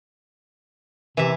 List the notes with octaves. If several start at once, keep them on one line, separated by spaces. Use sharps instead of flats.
C3 E3 E5